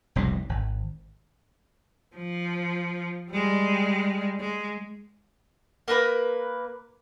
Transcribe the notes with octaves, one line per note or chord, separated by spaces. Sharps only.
F1 C2 G#2 B2
G#1
F3
G3 G#3
G#3
A#3 A#4 B4